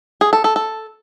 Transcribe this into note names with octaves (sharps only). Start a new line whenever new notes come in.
G#4
A4
A4
A4